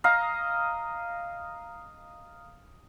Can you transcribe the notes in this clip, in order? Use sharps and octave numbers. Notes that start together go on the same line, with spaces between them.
D#5 F5 A#5